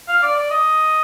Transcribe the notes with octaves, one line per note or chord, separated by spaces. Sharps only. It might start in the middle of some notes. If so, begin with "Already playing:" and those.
F5
D5
D5
D#5